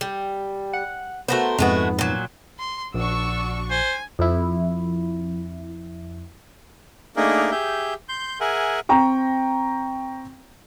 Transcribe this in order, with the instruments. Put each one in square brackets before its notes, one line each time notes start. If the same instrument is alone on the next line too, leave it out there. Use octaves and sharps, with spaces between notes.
[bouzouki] G3
[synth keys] F#5
[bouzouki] A3 A#4 C5 [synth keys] B3 F#4
[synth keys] F2 G#2 B3 [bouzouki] G#3 A3 F#4
[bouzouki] A#2 F#3
[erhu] C6
[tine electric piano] A#1 [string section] D4 F#4 C#6 [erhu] E6
[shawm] C5 [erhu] G#5
[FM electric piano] F2 E4
[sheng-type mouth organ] A3 A#3 D4 D#4 G#4 A#4
G4 G#4 E5 G6
C6 G6
G#4 A#4 E5 F#5 G#5
[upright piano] C4 G5 A#5 C#6